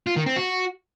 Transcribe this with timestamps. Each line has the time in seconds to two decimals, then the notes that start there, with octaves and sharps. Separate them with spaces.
0.07 F4
0.16 D#3
0.26 C4
0.36 F#4